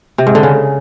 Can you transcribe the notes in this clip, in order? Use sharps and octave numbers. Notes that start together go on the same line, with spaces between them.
C3
G#2
D3
C#3